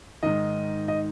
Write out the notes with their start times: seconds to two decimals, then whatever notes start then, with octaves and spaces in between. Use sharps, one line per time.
0.23 G#2 D#3 D#5
0.88 D#5